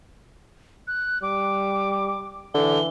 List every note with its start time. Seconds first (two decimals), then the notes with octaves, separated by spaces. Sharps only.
0.87 F#6
1.22 G3 D6
2.54 D3 E3 G7